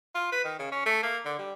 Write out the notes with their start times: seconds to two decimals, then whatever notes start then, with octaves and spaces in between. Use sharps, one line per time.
0.15 F4
0.32 B4
0.45 D#3
0.59 C#3
0.72 C#4
0.86 A3
1.03 A#3
1.25 D3
1.39 G3